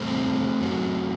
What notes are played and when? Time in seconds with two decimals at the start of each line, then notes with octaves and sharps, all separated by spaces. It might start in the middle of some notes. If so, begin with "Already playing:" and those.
Already playing: E2 C3 G3 A3 C4
0.60 F#2 F#3